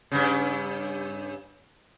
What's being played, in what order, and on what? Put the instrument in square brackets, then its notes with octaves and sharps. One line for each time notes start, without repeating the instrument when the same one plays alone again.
[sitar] G2 C#3